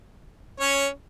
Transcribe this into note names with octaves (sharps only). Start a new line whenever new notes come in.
C#4 C#5